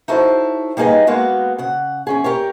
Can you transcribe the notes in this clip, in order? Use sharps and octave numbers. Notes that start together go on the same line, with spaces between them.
D#4 E4 F#4 A4 C5 C#5
G3 A#3 D#4 G#4 B4 D#5
G#3 A#3 B3 F#4
C#3 F#5
E2 C#4 G#4
G4 A#4 C#5